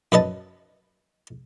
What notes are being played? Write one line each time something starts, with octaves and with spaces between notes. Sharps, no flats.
F#2 B4 D#5 A5